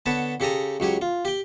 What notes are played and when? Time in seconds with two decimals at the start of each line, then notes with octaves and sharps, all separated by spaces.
0.06 D3 B3 B4 C#5 A5
0.40 C#3 G4 A4 A#5 D#6
0.80 C#2 F#3 G4 C#5
1.02 F4
1.25 G4 G5